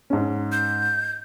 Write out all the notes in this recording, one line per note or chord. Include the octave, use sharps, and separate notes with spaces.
G#2 C#4
G6